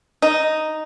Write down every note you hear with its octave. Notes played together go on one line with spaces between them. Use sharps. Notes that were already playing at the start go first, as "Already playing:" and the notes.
D#4